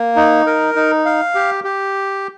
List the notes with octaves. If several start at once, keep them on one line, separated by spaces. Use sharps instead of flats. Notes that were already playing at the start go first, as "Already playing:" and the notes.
Already playing: A#3
D#4
A#4
D#4
F5
G4
G4